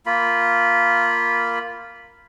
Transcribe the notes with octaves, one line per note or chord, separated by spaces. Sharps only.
A#3 F4 B5